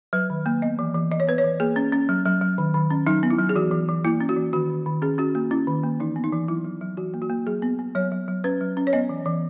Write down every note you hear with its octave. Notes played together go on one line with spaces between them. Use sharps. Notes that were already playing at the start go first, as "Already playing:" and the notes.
F#3 B4
D#3
A#3
B3 D#5
E3
E3
E3 D#5
C#5
B3 B4
C#5
E3
A#3 G#4
C#4
C#4
F#3
F#3
F#3
D#3
D#3
C#4
F#3 D#4
B3
E4
F#3
G#4
E3 F#4
E3
E3
A#3 E4
C#4
F#4
E3
D#3 F#4
D#3
D#3
C#4 G#4
C#4 F#4
A#3 F#4
C#4 E4
D#3
A#3
E3 D#4
B3
D#4
E3
F#3 E4
F#3
F#3
E3 F#4
A#3
F#4
A#3
F#3 G#4
B3
B3
F#3 C#5
F#3
F#3
C#4 B4
F#3
C#4
C#5
B3 D#5
E3
E3